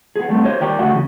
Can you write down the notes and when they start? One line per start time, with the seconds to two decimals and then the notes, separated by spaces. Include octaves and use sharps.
0.16 B3 G#4
0.29 G3 A3 B3 C4
0.44 G4 C5 C#5 D#5
0.61 D#2 G4 A#4 D5
0.79 D2 A3 F#4 G4 E5 F#5
0.93 E2 C#3